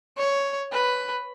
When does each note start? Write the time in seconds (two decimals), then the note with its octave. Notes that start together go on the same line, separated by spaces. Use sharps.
0.18 C#5
0.72 B4